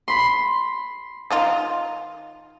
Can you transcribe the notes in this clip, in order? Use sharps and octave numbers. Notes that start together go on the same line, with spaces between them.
B5 C6
D#3 D#4 F4